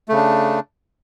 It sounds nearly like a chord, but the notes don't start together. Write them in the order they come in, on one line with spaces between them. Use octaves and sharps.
A3 C#3 D4